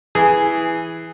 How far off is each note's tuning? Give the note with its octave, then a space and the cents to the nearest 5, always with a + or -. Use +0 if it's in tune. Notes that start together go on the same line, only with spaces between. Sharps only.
E3 +0 G#4 +0